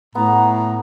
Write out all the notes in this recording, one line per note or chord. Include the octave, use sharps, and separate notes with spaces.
A2 B3 A#5